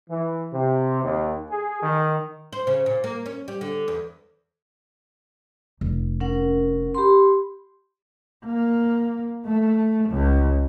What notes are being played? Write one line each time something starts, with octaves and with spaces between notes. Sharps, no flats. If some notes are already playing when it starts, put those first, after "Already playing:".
E3
C3
D#2
G#4
D#3
C5
C#3
A#2
A#3
C#4
G3
D3
E2
F1
C#4 A#4 F#5
G4 B5 C6
A#3
A3
C#2